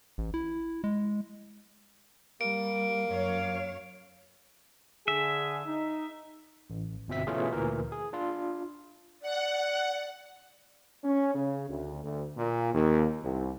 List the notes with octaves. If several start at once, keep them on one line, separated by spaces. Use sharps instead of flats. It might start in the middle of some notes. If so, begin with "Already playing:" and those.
A1
E4
G#3
G3 A#3 D7
F#2 C#5 F5
D3 G#4 E5
D#4
A1
G1 B2 C4 E5 B6
B2 E3 A3 C#4 F4 G#4
D2 A#2 E3 A#4
G#4
D4 F4
D5 F#5
C#4
C#3
D2
D2
A#2
D#2
C2